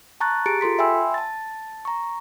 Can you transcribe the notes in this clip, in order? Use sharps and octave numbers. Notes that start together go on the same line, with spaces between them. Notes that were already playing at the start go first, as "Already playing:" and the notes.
A5 A#5 C#6 F#6 A6
G4 G#4 A#5 A6 C#7 D7
F4 A4 C6 B6
E5 G5 G#5 B5 C6 E6
A5 A6
A#5 C#6